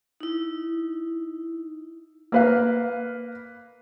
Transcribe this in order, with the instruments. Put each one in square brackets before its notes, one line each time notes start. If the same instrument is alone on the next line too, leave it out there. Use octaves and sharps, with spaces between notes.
[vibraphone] D#4 E4
[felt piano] A#3 B4 F5